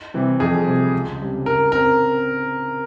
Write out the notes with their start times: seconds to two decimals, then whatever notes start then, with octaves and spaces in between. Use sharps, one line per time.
0.14 C3 E3 G3 C4
0.40 F2 G#4
0.67 C3 G3
0.93 C#2
1.19 C#3 G3 C4 G4
1.46 C#3 A#4
1.72 C4 A#4